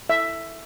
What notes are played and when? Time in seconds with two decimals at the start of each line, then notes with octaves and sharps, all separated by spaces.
0.10 E5